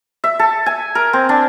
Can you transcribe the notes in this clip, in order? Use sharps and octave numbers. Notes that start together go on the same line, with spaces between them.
E5
A4
G#5
A#4
C4
D4